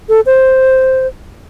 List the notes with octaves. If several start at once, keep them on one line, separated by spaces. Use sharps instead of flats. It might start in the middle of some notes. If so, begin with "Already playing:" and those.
A4
C5